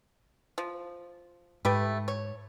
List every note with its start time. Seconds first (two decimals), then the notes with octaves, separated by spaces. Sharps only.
0.58 F3
1.65 G#2 A3 G4 B4
2.08 C#5